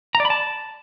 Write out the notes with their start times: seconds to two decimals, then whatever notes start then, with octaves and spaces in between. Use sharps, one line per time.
0.15 A#5
0.20 D5
0.25 B5
0.30 A5